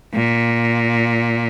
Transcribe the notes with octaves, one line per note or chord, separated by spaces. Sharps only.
A#2